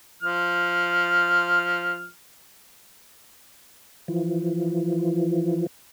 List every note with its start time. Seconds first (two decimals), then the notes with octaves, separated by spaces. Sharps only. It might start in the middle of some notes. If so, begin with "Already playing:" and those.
0.23 F3 F6
4.08 E3 F3